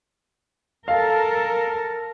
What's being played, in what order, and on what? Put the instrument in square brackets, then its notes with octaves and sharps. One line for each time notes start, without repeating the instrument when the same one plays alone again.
[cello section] A4 A#4 [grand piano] F5